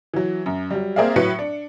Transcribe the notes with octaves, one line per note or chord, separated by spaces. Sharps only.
E3 F#3
F#2
F#3 G3
A#3 C4 G#4 D5 E5 F5
A2 F#3 B4 B5 C#7
D4